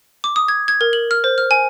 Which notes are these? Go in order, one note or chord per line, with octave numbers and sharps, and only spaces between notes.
D6
D#6
G#6
G#6
A#4
F#7
F6
C5
F6
G#5